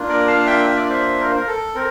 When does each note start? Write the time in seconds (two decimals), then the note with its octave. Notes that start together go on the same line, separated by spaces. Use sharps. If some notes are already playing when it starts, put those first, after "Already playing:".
Already playing: A#3 D4 F4
0.09 A#4 D5
0.27 F5 A5
0.46 E5 G5
0.65 E5
0.77 D5
0.90 C5 E5
1.20 A#4
1.29 C5
1.37 A#4
1.48 A4
1.75 C4 A#4